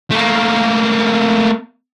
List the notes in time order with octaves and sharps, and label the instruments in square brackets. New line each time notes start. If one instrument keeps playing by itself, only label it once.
[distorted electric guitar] A3 A#3